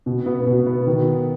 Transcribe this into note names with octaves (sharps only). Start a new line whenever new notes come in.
B2
B3
B2
B3
D#3